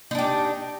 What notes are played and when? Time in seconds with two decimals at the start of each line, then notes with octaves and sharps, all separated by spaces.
0.11 D#4
0.15 D4
0.19 G4